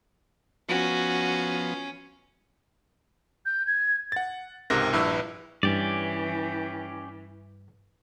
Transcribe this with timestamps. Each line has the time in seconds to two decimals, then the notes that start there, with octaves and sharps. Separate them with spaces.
0.69 F3 B3 C#4 F#4
3.46 G6
3.67 G#6
4.12 F#5 A6
4.70 C#2 G#2 C3 A#4 F#6 A#6
4.93 A#1 G2 E4 B4 E6
5.63 G2 E3 C#4 G4 D5